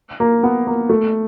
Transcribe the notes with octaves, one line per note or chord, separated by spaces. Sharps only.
A#3
B3
A#3
A3